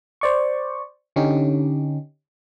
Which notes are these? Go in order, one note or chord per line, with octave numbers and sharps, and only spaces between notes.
C5 D5 C#6
D3 C#4 D#4 G4